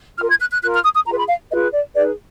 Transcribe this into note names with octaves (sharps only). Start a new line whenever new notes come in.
F4 A#4 F6
G#6
F#6
F#6
F4 A#4 F#6
F6
D#6
D#6
F4 G#4 B4 A#5
B5
F5
F4 G#4 B4 D#5
D5
D#4 G#4 B4 D5